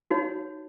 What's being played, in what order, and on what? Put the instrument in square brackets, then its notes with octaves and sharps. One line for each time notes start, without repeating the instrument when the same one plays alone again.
[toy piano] D#4 F#4 C#5